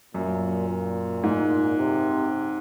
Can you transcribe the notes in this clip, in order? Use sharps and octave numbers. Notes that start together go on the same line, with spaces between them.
F#2 A#2
A#2
G#2
C3